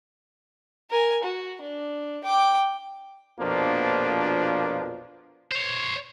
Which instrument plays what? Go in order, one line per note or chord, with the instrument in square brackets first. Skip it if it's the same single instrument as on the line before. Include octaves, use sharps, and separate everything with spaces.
[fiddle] A#4 G#5
F#4
D4
G5 D6
[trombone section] A#1 F2 B2 F3 A#3 D4
[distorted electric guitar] C5 C#5